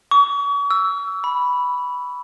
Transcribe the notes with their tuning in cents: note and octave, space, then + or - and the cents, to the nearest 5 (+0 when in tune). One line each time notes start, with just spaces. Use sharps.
C#6 +40
E6 +5
B5 +0